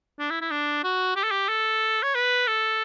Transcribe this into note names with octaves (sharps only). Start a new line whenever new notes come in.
D4
E4
E4
D4
F#4
G4
A4
G4
A4
C#5
B4
A4